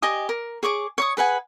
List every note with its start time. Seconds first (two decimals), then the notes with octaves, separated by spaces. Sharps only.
0.02 G4 D#5 G#5 D#6
0.29 A#4
0.63 G#4 C#5 C#6 D6
0.98 C#5 C#6 D#6
1.17 G#4 B4 F#5 G#5